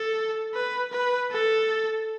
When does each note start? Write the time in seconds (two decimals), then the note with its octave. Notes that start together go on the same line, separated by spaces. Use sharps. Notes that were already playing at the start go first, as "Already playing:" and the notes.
Already playing: A4
0.54 B4
0.92 B4
1.31 A4